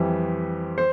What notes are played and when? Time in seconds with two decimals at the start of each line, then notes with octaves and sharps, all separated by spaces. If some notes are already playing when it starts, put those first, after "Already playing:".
Already playing: F2 E3 G3
0.78 C5